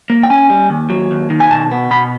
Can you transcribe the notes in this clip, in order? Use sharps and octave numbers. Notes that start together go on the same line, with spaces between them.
A#3
G5
C#4 G#5
G3
D#2
F#3
D#2
D#3
G#5
B2 A5
B3
B2 B5